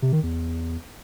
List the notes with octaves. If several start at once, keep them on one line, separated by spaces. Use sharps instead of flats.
C3
D#3
E2